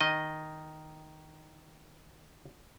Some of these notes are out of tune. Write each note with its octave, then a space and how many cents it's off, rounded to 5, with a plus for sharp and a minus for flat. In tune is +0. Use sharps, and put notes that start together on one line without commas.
D#3 +0 D#5 +0